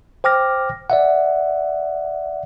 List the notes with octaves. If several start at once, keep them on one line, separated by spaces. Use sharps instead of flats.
C5 G5 D6 F6 A#6
D5 E5 F#5